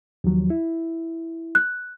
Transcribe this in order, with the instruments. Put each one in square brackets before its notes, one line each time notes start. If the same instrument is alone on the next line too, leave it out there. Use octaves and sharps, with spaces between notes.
[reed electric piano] D#2 F3 F#3
E4
[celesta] F#6